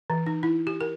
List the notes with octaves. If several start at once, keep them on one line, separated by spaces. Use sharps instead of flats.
E3
D#4
E4
G4
A#4